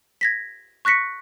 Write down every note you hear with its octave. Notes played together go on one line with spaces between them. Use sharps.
G#6 A#6 B6
C#6 F#6 A#6 B6 C#7